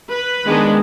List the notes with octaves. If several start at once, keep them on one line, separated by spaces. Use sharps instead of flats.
B4
D#3 G#3 B3 D4